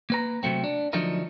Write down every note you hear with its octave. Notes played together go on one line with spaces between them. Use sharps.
A#3 B4 A#5
C3 F#3 A3 C4
D4
D3 F3 F#3 A3 D#4 A#4